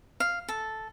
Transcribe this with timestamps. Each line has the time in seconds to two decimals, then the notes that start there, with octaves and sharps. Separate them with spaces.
0.20 F5
0.49 A4